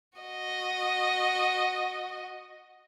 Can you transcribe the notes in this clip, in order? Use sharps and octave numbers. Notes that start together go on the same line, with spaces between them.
F#4 D#5